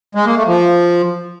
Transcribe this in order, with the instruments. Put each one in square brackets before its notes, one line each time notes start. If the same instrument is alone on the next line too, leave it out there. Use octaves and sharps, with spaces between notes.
[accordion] G#3
A#3
A3
F3